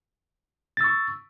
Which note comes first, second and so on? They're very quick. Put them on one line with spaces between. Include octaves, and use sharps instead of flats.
A6 E6 C#6